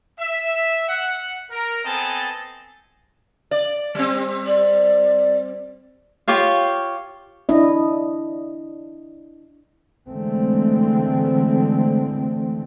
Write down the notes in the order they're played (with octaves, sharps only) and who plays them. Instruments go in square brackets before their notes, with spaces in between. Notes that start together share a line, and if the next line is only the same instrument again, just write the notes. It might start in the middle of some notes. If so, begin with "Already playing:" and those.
[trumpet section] E5
F#5
A#4
B3 C4 A4 D#5 G#5 A5
[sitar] D5
G3 C4
[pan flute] D5
[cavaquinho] F4 G4 C#5 F5
[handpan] D4 E4 D#5
[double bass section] D3 E3 G#3 A3 C4